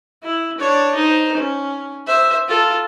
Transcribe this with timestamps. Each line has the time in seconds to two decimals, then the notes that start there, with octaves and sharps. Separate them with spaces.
0.23 E4
0.58 D4 C#5
0.95 D#4 C5
1.37 C#4
2.07 C5 E5
2.48 F4 A4